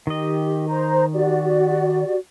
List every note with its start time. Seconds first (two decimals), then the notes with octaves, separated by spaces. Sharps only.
0.07 D#3 G4 D#5
0.68 C5 A#5
1.13 F#4 G4 D5